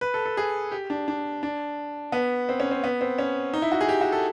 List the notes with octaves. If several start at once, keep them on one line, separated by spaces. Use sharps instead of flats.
B4
A4
A4
G#4
G4
D4
D4
D4
B3
C4
C#4
C4
B3
C4
C#4
D#4
E4
F#4
G#4
G4
F#4
A4